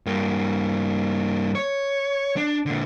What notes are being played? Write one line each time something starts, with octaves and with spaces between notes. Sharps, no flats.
G2 A#3
C#5
D4
A#2 D3